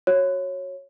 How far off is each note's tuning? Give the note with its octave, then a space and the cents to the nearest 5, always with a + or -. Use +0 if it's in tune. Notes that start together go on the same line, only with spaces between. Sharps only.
F#4 +0 C#5 -15